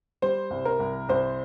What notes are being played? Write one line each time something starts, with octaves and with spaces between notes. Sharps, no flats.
G3 C5
C2
A#4
C2
C2 C5